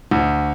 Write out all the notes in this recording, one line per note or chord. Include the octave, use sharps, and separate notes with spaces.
D2